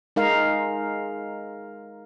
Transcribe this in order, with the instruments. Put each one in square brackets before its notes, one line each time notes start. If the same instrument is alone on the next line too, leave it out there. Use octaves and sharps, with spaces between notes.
[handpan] G#3 D#4 A#4 F5